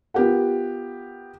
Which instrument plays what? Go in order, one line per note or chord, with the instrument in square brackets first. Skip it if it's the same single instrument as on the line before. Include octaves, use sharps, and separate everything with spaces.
[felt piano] B3 F4 G4 A#4 F#5